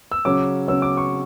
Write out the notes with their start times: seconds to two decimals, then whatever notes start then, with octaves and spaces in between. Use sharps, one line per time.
0.12 E6
0.25 C#3 F#3 C#4 D6
0.68 C#3 F#3 C#4 E6
0.82 D6
0.97 C#6